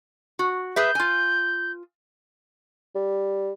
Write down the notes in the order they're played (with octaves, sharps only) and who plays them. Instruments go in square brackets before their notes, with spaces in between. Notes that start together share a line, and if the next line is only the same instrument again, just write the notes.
[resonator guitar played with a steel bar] F#4
[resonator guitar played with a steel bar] G#4 B4 E5 [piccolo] G6
[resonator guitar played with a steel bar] F4 G#5
[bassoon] G3